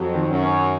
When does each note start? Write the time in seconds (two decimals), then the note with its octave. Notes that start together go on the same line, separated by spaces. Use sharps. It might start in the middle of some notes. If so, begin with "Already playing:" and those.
Already playing: F2 F#3
0.14 D#3
0.28 F#2
0.43 C#4